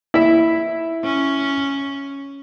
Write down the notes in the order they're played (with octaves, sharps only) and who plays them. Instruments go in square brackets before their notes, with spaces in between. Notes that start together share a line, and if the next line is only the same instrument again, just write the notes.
[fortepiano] E4 E5
[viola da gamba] C#4